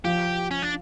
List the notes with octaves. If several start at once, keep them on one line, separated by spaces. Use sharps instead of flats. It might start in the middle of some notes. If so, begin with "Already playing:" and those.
F3 G4
C#4
D4